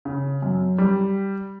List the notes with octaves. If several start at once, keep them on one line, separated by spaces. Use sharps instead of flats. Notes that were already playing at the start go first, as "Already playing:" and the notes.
C#3
F#2
G3